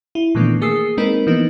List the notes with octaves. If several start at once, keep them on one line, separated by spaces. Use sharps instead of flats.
E4
A#2 D#3 E3 A3 B3 D4
A#3 G#4 D#6 E6 C7
G#3 C4 D#4 A#4 B4
E3 F3 A#3 B3 D#4